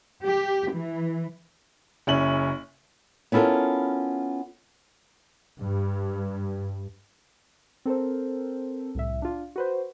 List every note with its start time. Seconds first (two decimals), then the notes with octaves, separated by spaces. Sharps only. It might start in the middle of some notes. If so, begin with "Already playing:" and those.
0.24 G4
0.74 E3
2.07 F#1 C#4 E4 F#7
3.32 B3 C#4 E4 F4 A4 A#4
5.58 G2
7.85 C4 A4 A#4 C5
8.95 C2 A2 E5
9.22 D4 F4
9.56 F#4 B4 C5